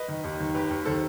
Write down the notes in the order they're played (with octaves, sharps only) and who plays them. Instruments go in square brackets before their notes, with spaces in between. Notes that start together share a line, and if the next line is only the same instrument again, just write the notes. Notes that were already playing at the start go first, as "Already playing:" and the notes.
Already playing: [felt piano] B4 D#5
D#3
D#2
D#3
D#2 G4 B4
D#2
D#3 A4 C5